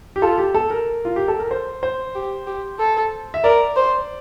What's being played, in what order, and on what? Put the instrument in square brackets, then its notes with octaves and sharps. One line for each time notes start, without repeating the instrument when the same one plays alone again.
[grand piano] G4
[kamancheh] F4 [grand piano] A4
[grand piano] G4
A4
A#4
F4
G4
A4
A#4
C5
C5
[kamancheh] G4
G4
A4
[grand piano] E5
[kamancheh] A#4 [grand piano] D5
[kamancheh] C5